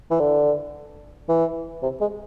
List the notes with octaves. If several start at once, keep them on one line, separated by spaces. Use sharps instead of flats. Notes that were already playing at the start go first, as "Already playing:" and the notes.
E3
D3
E3
C3
G#3